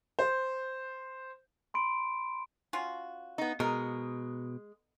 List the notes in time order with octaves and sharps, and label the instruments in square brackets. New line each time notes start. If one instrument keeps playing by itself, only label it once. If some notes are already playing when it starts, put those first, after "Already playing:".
[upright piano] C5
[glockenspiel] B5 C6 D7
[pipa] C#4 F4 F#4
[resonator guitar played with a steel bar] B3 D#4
[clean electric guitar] B2 [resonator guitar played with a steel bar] G#3 [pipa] A#4